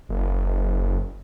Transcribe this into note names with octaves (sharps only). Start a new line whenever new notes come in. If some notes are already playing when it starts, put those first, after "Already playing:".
F#1